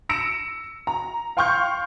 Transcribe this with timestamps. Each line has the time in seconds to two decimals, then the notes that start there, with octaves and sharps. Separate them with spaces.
0.09 E6 A#6 C#7 D7 E7
0.87 A#5
1.37 F5 G5 C6 C#6 F6 G6